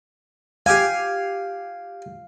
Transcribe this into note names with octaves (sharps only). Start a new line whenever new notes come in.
G4 F5 G#5